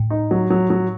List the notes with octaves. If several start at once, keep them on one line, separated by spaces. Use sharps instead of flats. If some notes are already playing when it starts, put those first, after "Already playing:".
Already playing: A2
D#4
F#3
F#3
F#3